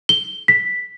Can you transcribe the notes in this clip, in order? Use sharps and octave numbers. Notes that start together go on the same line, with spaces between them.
G7
B6